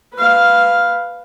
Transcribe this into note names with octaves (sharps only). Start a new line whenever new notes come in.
B4 F5